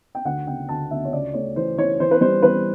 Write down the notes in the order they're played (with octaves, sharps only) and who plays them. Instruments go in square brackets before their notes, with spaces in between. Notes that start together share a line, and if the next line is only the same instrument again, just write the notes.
[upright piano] G5
D2 F#5
C#3 G5
D2 A5
D2 E5
C#5
C#2 D5
A3 C#5
E3 C5
E3 C#5
E3 C5
B4
G3 C5
E3 B4